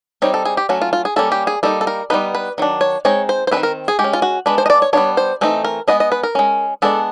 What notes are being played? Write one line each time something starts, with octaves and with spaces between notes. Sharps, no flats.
G3 C4 D#4 C#5
A4
G#4
G4
F#3 A3 C#4 F#4
F4
F4
G#4
G3 A#3 C#4 A4
G4
G#4
G3 A#3 D#4 A4
A4
A#4
G3 B3 D#4 B4
B4
D#3 F#3 D4
C#5
G#3 C4 D#4 C#5
C5
C5
G#3 C4 B4
D#3
A#4
G#4
G#3 G4
C#4
F4
F#4
G#3 B3 D4 B4
C5
D#5
D5
C#5
G3 B3 D4 C#5
C5
E3 A3 C4 D#4
A#4
G#3 B3 D4 D#5
D#5
B4
A#4
G#3 C#4
G#3 B3 D4 A4